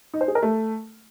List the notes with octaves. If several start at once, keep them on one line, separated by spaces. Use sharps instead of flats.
D#4
C5
G#4
A#4
A3